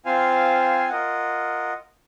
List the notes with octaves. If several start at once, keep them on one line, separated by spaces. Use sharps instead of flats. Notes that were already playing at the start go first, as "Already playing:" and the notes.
C4 F4 C5 F5 G#5
F4 A#4 D#5 F#5